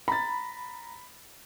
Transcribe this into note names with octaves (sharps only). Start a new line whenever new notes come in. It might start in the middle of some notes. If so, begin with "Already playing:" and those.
A#5 B5 A6